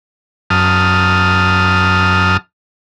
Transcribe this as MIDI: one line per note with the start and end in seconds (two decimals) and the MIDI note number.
0.50 2.37 42
0.50 2.37 81
0.50 2.37 87
0.50 2.37 89